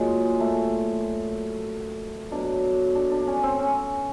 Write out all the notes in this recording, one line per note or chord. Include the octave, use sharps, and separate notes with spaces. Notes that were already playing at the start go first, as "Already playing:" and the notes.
Already playing: A#2 F#3 G#3
A3
B2 F#3 D4
D4
D4
C#4
C4
C#4